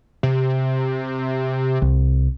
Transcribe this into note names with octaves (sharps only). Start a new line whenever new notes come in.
C3
C2